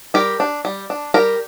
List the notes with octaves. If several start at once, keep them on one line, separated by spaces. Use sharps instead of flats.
G3 G4 A#4
D4
G3
D4
G3 G4 A#4